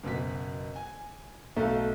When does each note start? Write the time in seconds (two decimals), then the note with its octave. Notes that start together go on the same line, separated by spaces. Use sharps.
0.04 F#1 B2 B6
0.76 G#5
1.56 B1 A3 D#4 F5